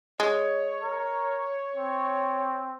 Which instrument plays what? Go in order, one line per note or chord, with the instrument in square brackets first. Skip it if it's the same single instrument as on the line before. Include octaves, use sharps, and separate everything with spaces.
[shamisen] G#3 [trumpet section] C#5
[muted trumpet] A#4
C4